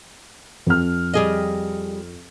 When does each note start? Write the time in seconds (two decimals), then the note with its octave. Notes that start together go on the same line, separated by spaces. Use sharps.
0.67 F2 F6
1.14 G3 G#4 D#5